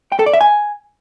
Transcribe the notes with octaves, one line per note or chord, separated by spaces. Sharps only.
G5
A4
D5
E5
G#5